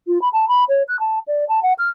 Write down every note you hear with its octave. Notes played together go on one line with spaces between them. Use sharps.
F4
B5
A5
B5
C#5
F#6
A5
D5
A5
F#5
F6